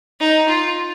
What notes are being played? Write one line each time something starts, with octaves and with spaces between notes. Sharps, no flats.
D#4
F4